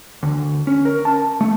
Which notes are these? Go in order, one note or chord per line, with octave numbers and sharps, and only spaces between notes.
D2
C#4
A#4
A5
A3